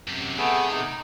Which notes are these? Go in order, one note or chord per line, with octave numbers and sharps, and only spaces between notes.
F#2 C3
C3 A3 B3 G#4
D#4